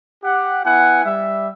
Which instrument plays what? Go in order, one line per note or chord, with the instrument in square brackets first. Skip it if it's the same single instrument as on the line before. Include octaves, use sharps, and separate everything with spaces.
[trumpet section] G4 F#5
B3 E4 F#5 G#5
G3 E5